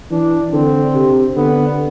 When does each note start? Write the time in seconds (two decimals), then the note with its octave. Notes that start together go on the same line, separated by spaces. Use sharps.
0.11 E3 D4
0.52 D3 C4
0.95 C3
1.36 D3 B3